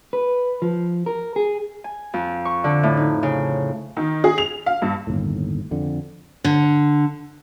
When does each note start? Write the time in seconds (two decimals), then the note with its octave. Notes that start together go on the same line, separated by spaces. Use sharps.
0.13 B4
0.62 F3
1.06 A#4
1.36 G#4
1.84 G#5
2.14 F2
2.45 C#6
2.64 D3
2.83 A2
2.97 D#4
3.23 C#3
3.97 D#3
4.24 G#4
4.38 F7
4.66 F5
4.82 G2
5.07 G1 D#2 A2
5.71 F2 D3
6.44 D3